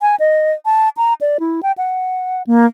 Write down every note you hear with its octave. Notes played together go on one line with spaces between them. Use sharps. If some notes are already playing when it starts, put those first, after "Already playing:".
G#5
D#5
A5
A#5
D5
E4
G5
F#5
A#3